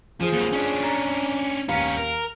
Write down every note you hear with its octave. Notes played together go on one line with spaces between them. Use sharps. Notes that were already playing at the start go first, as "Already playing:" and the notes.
F3 F4 G#4 C5
D#2 F#3
C#4 D4
A#5
D#2 B3 C#4 F5 A#5
A#4